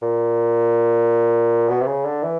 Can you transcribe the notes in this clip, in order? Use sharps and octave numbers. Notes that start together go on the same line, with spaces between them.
A#2
B2
C3
C#3
D3
E3